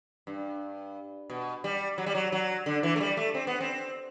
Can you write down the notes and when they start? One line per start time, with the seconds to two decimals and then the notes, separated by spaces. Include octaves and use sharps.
0.27 G2
1.30 B2
1.64 G3
1.98 F#3
2.06 G3
2.15 F#3
2.32 F#3
2.66 D3
2.83 E3
2.96 A3
3.01 G3
3.17 A3
3.35 C4
3.47 B3
3.60 C4